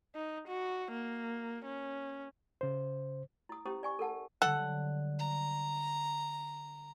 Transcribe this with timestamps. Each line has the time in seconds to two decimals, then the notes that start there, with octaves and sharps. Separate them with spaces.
0.15 D#4
0.47 F#4
0.92 A#3
1.65 C#4
2.61 C#3 C5
3.49 E4 D#6
3.65 C#4 E4 G4 C5 D#6
3.83 D5 G#5 C#6
3.99 A4 A#4 F#5 A5
4.42 D3 F#3 G3 A4 F#5
5.19 A#5